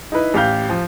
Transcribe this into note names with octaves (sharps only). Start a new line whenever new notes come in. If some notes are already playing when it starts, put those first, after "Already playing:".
D#4 E4 B4
A1 G4 F5 G6
F3